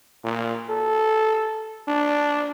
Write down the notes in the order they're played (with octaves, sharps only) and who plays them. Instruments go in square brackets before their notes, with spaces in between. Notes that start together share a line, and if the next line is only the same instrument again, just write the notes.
[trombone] A#2
A4
D4